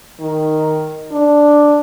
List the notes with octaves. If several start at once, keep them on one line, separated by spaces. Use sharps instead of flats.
D#3
D4